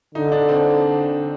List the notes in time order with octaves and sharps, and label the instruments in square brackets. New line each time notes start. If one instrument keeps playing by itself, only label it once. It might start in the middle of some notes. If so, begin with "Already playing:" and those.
[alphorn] D3 [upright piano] D#4
[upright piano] D4
C4